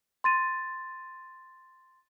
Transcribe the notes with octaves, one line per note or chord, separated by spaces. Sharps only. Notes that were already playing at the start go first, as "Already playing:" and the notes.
C6 A6 D#7